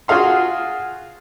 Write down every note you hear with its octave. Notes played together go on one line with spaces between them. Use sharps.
F4 F#4 G#4 F5 C6